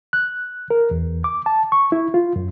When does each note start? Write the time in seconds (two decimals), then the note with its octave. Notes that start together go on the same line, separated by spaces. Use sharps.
0.13 F#6
0.70 A#4
0.91 E2
1.24 D6
1.46 A5
1.72 C#6
1.92 E4
2.14 F4
2.36 F#2